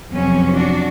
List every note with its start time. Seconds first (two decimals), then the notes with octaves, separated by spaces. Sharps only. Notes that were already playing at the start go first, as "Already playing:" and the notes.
0.12 F2 C3 F#3 B3 C#4
0.54 D4 F#4